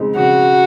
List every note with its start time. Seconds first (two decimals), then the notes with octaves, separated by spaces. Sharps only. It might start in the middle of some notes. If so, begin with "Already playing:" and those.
Already playing: C#3 G#3 C4 D#4
0.16 C#3 F#4